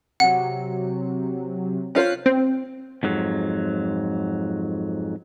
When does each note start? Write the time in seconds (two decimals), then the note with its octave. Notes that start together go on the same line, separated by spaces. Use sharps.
0.20 C3 F#3 F#5
1.95 C#4 F4 C5 F#6 C7
2.26 C4
3.03 F2 G#2 F#3